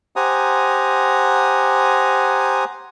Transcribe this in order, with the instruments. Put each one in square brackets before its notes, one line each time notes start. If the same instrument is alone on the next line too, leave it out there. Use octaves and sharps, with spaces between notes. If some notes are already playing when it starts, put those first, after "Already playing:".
[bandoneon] G4 C5 F#5 G#5 A#5 D#6